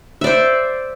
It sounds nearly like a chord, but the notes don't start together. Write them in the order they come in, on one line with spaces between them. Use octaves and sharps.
E5 D5 C5